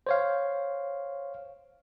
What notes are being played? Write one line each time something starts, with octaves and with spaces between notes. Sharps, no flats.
C5 C#5 F5